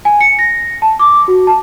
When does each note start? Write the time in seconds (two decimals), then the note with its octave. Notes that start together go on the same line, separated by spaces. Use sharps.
0.05 G#5
0.21 C#7
0.39 A#6
0.82 A5
0.99 D6
1.28 F#4
1.47 A5